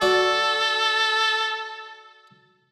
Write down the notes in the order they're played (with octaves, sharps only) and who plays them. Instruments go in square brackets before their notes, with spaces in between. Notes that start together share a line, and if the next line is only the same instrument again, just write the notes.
[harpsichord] F#4 D5 [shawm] A4